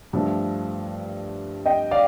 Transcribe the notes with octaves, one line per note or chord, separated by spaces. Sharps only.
G2 F3 A3
D#5 G5
D5 F5